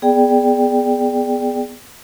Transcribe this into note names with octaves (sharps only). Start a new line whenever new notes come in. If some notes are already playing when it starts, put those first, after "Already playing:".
B3 G#4 D5 G5